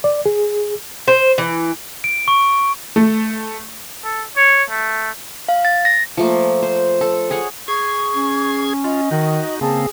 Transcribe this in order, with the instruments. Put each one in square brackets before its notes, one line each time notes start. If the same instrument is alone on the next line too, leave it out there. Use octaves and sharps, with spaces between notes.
[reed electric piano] D5
G#4
[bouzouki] C5
E3
[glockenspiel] D7
C#6
[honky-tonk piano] A3
[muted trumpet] A4
C#5
A3
[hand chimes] F5
A6
A#6
[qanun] F3 A3 A#3
C5
A4
G#4 C#5 F#5
[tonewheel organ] G#4 G#6 [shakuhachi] C#6
[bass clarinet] C#4
[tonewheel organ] F4 [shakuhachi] D#5
[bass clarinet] D#3 [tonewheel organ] D#4 F#4
[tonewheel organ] C#3 A#3 C4 [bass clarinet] G#4 [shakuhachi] A5